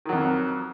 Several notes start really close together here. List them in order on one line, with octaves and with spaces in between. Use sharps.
D#3 F#3 F2